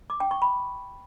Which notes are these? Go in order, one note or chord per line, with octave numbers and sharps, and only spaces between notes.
D6
G5
C#6
B5